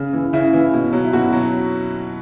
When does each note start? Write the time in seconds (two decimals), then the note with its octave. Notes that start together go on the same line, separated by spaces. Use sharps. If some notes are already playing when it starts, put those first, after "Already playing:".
Already playing: C#3
0.13 E3
0.33 C#3 E4
0.53 E3
0.73 B2
0.93 F#3
1.04 E4
1.13 B2 F#4
1.33 F#3